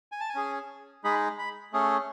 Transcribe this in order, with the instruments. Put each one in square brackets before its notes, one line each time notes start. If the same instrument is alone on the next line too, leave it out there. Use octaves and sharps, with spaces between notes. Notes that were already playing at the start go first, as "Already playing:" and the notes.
[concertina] G#5
A5
G#5
C#4 G#4
G#3 D#4 G#4 B5
B5
A3 C#4 G#4